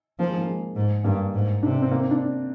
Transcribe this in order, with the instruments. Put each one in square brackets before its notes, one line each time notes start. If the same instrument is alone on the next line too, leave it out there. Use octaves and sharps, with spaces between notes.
[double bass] F3 [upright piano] A#3
[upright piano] G#3
A#3
G#3
[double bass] G#2
[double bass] G2 [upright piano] A#3
[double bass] G#2
[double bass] C3 [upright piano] D4
[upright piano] C4
C4
A#3
C4
D4